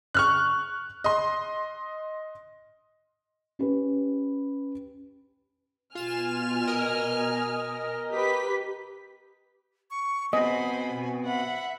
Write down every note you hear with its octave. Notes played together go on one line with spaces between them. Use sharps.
C#6 F6 F#6
D#5 C6
C#4 G4 B4
B2 F4 G#5 F6 E7
A#4 D#5
G4 B4 B6
C#6
B3 C4 F#4 C5 D#5 G#5 B5
B2
E5 F#5 B5